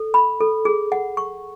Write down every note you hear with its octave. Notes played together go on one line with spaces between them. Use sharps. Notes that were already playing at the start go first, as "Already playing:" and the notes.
Already playing: A4
B5
A4
G#4
F#5
C#6